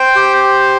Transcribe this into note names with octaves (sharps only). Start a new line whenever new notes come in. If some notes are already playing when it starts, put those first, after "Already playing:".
Already playing: C5 G5
G4